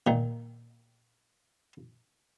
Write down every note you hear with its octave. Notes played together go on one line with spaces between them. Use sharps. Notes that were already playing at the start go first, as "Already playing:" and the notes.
A#2 D#3